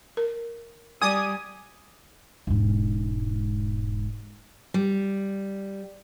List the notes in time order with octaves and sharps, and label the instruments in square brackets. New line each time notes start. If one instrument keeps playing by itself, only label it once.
[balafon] A#4
[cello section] G3 [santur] D5 G#5 [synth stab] D#6
[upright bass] E1 G#2
[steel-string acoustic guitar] G3